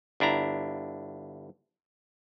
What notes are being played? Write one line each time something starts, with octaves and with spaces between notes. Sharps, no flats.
G1 D4 E4 A#5